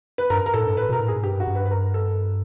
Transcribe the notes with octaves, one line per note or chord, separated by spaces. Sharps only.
B4
G2 A#4
A#4
A2 A4
G2
A2 B4
B2 A#4
A2
G#2 G#4
G2 G4
F#4
G2
B4
B4
A#4
A4